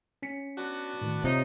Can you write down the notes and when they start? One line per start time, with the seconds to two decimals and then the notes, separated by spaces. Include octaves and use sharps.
0.22 C#4 B6 C#7
0.56 B3 D4 F#4
1.01 A2 D#3
1.24 C3 D#4 F4 C#5 D#5